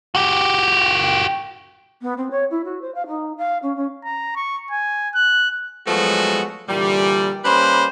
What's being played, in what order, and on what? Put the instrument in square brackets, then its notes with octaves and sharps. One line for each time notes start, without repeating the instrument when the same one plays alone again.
[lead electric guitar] F#4 G4
[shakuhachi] B3
C4
C#5
E4
F#4
C5
F5
D#4
F5
C#4
C#4
[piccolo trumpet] A#5
C#6
G#5
F#6
[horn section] F3 F#3 G#3 A3 B3 F#4
A#2 D3 E3 G3
G3 A#3 C#4 B4 C5